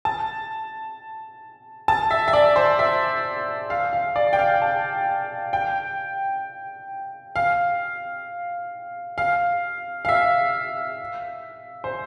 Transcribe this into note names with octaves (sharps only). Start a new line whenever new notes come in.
A5
A5
E5
E5
D5
C5
E5
F5
F5
D5
G5
F5
A5
G5
F5
F5
F5
E5
C5